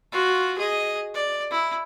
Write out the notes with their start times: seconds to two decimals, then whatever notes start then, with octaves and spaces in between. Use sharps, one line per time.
0.12 F4 F#4
0.58 G#4 D#5
1.14 D5
1.50 E4